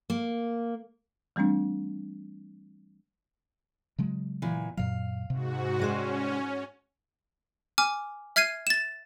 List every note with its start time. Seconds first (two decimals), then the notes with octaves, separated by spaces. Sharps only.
0.10 A#3
1.36 E3 G3 A3 C4 D4
3.98 C#3 F#3 G#3
4.42 A#2 E3
4.77 F#2 A#2 F#3 F5
5.30 G#2 C3 F#4
5.79 G3 G#3 C#4 C5
7.78 G#5 D6 F6
8.36 E5 F6 G#6 C7 D#7
8.67 A6 E7